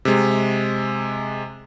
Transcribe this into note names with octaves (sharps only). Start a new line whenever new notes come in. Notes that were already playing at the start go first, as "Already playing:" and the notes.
C3 G#3